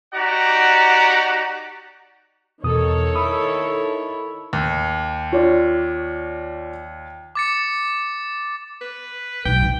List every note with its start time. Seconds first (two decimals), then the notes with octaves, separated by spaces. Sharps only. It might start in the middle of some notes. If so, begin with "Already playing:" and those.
0.14 D#4 F#4 G4 D5 F#5 A#5
2.64 E2 B2 D#3 A4 C#5 D#6
3.16 E4 D#6
4.53 D#2
5.32 F4 C#5 D5
7.35 D6 A6 C#7
8.81 B4
9.45 B1 G5
9.61 C3